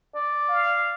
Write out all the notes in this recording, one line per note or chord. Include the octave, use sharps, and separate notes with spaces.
D5
F5